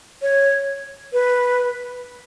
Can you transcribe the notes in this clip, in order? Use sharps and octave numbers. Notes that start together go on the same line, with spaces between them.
C#5
B4